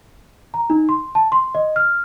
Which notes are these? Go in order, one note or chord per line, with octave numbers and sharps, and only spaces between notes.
A#5
D#4
C6
A5
C6
D#5
F6